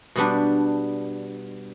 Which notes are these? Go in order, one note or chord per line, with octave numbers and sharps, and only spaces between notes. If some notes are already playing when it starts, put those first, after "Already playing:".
B2 G3 B3 D4